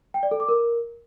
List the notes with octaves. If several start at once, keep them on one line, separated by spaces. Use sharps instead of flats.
G5
D5
A4
D6
A#4